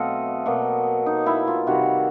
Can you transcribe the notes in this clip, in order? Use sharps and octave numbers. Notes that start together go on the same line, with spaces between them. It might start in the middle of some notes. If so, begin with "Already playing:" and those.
Already playing: B2 F#3 A3 C4 A4 D#5 F5
B2 F#3 A#3
D#4
E4
F4
C3 D#3 G3 F#4